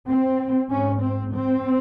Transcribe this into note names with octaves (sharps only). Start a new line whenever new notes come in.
C4
G#2 C#4
C4
C4